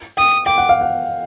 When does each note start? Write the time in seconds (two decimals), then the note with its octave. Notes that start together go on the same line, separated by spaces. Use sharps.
0.17 G5 D#6
0.46 G5 D6
0.58 F#5
0.69 F5
0.81 F#5